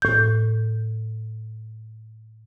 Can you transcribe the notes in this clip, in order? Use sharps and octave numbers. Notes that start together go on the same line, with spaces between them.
A2 G6